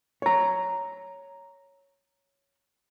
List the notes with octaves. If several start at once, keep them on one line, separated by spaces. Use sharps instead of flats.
C#5 A#5